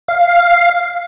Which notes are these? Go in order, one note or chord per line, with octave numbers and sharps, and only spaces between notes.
F5